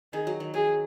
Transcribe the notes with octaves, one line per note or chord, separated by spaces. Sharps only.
D#3 G#4
F#3
D#3
F#3 G#4